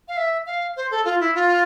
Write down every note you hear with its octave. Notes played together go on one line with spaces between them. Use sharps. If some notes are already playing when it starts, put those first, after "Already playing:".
F5
E5
F5
C5
A4
F4
E4
F4